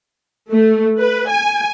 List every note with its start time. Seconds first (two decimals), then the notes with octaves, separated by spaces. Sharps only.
0.52 A3
0.98 B4
1.29 G#5